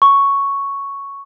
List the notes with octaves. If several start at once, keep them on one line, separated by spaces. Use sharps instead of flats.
C#6